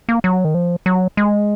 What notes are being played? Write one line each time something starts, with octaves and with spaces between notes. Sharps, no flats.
A#3
F#3
D#3
F3
F#3
G#3